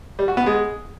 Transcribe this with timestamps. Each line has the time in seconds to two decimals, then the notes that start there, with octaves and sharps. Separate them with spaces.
0.19 G3
0.28 F#4
0.37 B3
0.46 G#3